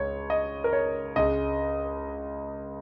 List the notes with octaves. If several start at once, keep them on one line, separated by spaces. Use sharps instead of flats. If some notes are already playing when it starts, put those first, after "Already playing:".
Already playing: C#2 C#3 C#5
D#5
A#4
C#5
C#2 C#3 G#3 D#5